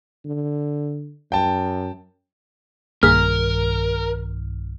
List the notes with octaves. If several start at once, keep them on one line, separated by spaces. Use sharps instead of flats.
D3
F#2 G5 A5
B1 G2 D#3 A#3 G#4 A#4 F6 B6